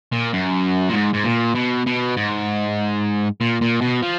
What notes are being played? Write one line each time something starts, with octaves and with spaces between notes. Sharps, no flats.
A#2
F#2
A#2
G#2
G#2
A#2
B2
B2
G#2
A#2
A#2
B2
F3